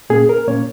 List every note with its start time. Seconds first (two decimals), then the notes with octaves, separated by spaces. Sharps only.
0.10 A#2 A#3 C#4 G#4
0.29 A#4
0.48 A#2 A#3 C#4 C#5